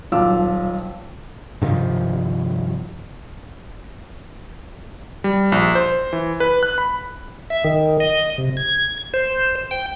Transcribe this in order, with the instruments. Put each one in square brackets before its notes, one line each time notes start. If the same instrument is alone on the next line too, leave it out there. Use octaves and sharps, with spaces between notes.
[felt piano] D#1 B1 F4 D6 E6
[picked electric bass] G2 C3 D#3 F3
[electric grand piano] G3
A#1
C5
E3
B4
F#6
B5
[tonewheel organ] E5
D#3
D#5
C3
G#6
C5
G5